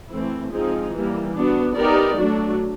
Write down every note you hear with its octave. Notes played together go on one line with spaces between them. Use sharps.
E3 A3 C4 E4
F3 G#3 C4 D#4 G#4
E3 G3 A#3
B3 D4 F#4
B3 D#4 G4 A#4 D5
F#3 A3 D4 F#4